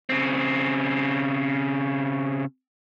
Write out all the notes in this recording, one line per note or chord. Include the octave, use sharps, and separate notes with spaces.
C#3 C4